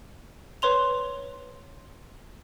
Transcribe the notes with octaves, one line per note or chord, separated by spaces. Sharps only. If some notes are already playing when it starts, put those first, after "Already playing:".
B4 C#5 C6 F7